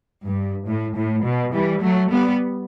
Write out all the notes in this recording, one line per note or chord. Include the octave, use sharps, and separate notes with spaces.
G2
A2
A2
B2
E3 G3
F#3 A3
G3 B3